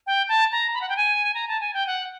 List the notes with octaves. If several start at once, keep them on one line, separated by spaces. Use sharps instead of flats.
G5
A5
A#5
B5
F#5
G5
G#5
A#5
A5
G#5
G5
F#5